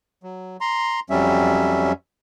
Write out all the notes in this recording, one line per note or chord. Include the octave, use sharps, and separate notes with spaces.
F#3
A#5 C6
F2 F#3 G3 C#4 E5